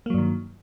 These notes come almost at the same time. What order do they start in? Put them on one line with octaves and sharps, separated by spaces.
A#3 F#3 G2 D#3